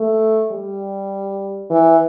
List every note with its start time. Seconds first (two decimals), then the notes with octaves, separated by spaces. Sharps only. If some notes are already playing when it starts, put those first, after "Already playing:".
Already playing: A3
0.52 G3
1.70 E3